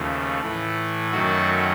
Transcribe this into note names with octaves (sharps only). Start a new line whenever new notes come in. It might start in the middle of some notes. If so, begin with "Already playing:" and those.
Already playing: D#2 C#3 F3 A3
A2 E3 A3
F#2 D#3 F#3 A3 F#4